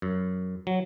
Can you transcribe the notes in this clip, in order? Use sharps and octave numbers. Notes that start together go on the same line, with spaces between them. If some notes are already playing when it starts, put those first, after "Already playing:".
F#2
F#3